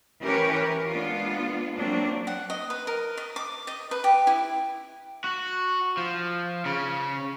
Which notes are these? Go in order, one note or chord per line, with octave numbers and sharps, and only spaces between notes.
E3 C#4 G4 A#4 B4 C#5
A#4
G#3 B3 D4 F4
F#3 A#3 C4 D4
F#5
D#5
B4
A#4
D#5
D6
D#5
B4
G4
E4
F#4
F3
C#3